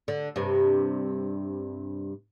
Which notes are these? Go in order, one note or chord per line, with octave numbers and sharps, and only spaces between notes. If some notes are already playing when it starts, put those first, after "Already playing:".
D3
G2 C3